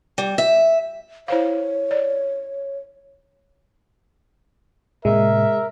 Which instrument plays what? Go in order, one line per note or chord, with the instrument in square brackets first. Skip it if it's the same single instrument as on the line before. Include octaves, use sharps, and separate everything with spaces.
[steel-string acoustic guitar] G3
E5
[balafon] E4 C5 F5 [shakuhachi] C#5
[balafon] D5
[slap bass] A2 C3 A#3 [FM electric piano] G#3 [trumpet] A#4 [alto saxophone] E5